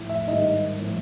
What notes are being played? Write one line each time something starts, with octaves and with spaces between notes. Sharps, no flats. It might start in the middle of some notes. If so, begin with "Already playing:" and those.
Already playing: A2 F3
E5
G#2 D#3 G3 D#5
A2 F3